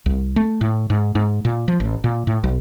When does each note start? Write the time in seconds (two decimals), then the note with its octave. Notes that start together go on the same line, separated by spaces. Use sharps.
0.06 C2
0.36 A3
0.61 A2
0.90 G#2
1.15 G#2
1.45 A#2
1.68 F3
1.80 A1
2.04 A#2
2.27 A2
2.44 B1